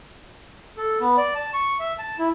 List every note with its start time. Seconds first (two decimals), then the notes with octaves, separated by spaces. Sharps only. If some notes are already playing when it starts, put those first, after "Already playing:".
0.77 A4
1.01 B3
1.17 D5
1.35 A5
1.53 C#6
1.80 E5
1.98 A5
2.19 E4